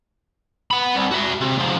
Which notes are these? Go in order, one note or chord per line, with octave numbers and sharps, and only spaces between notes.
F#5 B5
C2
F#4 E5
C3
G#2 F3